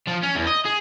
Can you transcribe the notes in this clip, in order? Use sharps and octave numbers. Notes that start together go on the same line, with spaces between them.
F3
C#4
E2
D#5
G#4